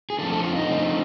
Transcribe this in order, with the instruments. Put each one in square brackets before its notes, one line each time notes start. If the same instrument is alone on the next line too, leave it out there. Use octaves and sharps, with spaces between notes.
[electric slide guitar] G#4
D3 F3 A3 C4 A4
A4
F4
D#4
D3 F3 A3 C4